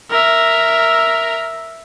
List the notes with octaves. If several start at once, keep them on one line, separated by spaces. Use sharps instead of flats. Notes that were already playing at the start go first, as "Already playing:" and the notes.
A#4 E5